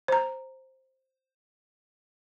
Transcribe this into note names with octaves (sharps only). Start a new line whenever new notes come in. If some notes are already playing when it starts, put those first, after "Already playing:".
C5 A#5